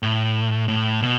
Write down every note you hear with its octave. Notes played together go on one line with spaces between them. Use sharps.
A2
A2
B2